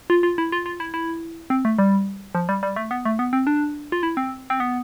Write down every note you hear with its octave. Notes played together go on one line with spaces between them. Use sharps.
F4
F4
E4
F4
F4
E4
E4
C4
A3
G3
F3
G3
G3
A3
B3
A3
B3
C4
D4
F4
E4
C4
C4
B3